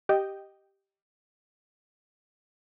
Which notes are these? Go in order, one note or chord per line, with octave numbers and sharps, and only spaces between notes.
G4 D#5 G5